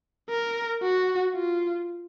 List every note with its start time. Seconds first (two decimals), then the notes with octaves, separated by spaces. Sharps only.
0.30 A#4
0.83 F#4
1.33 F4